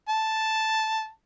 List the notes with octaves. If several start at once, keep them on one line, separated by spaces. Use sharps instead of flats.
A5